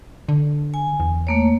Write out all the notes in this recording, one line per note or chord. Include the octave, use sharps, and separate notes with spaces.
D3
G#5
E2
A3 A#3 C#5